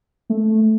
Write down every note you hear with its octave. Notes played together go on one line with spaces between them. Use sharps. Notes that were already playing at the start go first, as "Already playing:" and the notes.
A3